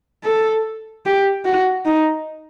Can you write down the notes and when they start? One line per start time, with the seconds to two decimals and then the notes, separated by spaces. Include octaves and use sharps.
0.24 A4
1.06 G4
1.45 F#4
1.85 D#4